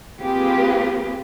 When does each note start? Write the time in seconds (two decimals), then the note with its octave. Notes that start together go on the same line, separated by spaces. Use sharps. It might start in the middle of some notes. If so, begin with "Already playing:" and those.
0.20 A#3 C4 F4 G4 G#4 B4